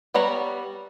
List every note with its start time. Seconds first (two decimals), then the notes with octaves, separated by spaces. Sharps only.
0.14 G3 B3 C#5 A#5